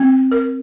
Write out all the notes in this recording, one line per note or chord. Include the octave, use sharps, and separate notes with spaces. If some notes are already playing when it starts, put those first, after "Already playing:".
Already playing: C4
A#4